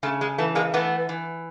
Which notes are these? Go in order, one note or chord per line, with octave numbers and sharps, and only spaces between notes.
C#3 A3
G#3
E3 A3
G#3 A#3
E3 A3 B3
E3